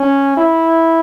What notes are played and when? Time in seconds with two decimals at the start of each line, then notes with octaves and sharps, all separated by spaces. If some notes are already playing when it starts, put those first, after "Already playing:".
Already playing: C#4
0.37 E4